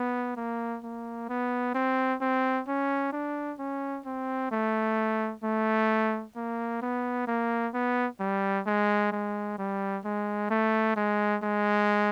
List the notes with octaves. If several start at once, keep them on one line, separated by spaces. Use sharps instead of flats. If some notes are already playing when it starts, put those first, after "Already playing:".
Already playing: B3
A#3
A#3
B3
C4
C4
C#4
D4
C#4
C4
A3
A3
A#3
B3
A#3
B3
G3
G#3
G#3
G3
G#3
A3
G#3
G#3